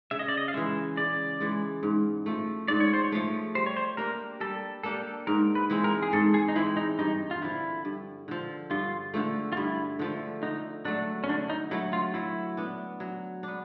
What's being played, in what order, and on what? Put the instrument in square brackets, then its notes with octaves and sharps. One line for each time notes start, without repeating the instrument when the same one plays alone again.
[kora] C#3 [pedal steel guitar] E5
[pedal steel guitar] D#5
D5
D#5
F5
[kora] E3 G#3 [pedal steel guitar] E5
[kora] C#3 [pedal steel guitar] D5
[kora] E3 G#3
G#2
F3 A3
[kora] G#2 [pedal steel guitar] D5
[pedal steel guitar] C#5
C5
C#5
[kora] F3 A3
[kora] G3 [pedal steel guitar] C5
[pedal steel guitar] C#5
C5
[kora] A#3 D4 G4 [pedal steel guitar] A#4
[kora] G3 [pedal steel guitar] A4
[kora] A#3 D4 G4 [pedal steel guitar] A4
[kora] G#2 [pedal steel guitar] A#4
[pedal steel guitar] B4
[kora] E3 G#3 C4
[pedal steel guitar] A#4
G#4
[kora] G#2 [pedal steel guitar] A4
[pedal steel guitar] G#4
D#4
[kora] E3 G#3 C4 [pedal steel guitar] E4
[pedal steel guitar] D#4
[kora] G2 [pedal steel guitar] D#4
[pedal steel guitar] F4
[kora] D3 F3 [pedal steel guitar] E4
[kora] G2
D3 F3
[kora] G2 [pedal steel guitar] F4
[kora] D3 F3 A3
[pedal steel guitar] F4
[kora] G2 [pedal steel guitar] E4
[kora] D3 F3 A3
[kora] D3 [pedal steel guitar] D#4
[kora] F#3 A3 [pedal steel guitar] D4
[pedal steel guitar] C#4
[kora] D3 [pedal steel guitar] D4
[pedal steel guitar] D#4
[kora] F#3 A3 [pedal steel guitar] E4
[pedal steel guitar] F4
[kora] F#3 [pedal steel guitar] E4
[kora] B3 D4
F#3
B3 D4